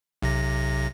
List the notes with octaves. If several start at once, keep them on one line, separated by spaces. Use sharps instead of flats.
B1 C3 A#6